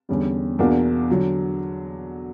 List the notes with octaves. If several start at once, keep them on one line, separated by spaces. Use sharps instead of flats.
E2 D3 G3 C#4
E2 B2 A#3 D4 F#4
D3 F#3